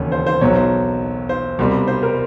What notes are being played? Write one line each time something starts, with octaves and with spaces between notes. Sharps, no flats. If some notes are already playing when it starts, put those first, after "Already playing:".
Already playing: E1 D#2 C#3 C#5
C5
C5
B1 B2 F#3 C#5
C5
C5
C2 B2 G3
C5
A#4